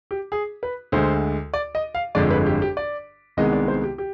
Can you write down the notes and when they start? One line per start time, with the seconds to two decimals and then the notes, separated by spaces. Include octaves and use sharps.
0.11 G4
0.32 G#4
0.63 B4
0.92 D2 D3 G#3 C5
1.54 D5
1.75 D#5
1.95 F5
2.15 G1 F2 D3 G#3 D5
2.30 B4
2.46 G4
2.62 G4
2.77 D5
3.37 C2 C3 D#3 G#3 B3 D#5
3.53 D5
3.68 C5
3.84 G4
3.98 G4